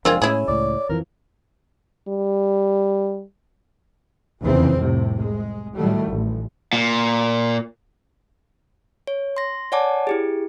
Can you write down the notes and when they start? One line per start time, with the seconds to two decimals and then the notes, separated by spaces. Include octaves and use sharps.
0.05 F#1 F3 G#3 C4 D4 F4 G#4 A#4
0.22 A2 C#4 E4 G#4 C#5
0.48 C#2 A2 D5
0.89 F2 E3 F3 A#4
2.08 G3
4.42 F1 E2 C#3 E3 C4
4.78 C2 A2 C3
5.20 G#3
5.76 A2 D#3 F#3 G3 A3
6.10 A1
6.73 A#2
9.07 C#5
9.37 C6 A#6
9.72 C#5 D5 F#5 G#5 A5 D6
10.07 E4 G4 G#4